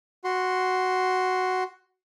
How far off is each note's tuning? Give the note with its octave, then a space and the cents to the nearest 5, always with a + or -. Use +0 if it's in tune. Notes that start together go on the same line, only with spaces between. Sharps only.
F#4 +0 C6 +0